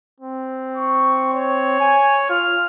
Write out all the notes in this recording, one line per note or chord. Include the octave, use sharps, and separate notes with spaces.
C4
C#6
C#5
G#5
F4 F6